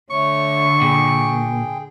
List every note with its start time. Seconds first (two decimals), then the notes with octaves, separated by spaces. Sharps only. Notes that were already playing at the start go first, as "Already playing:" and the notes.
0.10 D3 A3 C#5 C#6
0.82 A#2 G#4 G5